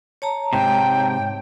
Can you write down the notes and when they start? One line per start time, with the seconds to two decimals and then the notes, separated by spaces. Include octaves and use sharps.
0.22 C#5 A5 A#5
0.53 G#2 C3 G5